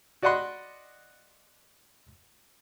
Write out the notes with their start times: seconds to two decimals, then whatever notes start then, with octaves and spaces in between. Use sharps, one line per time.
0.22 F#4 D5 D#5 F#5 B5 C6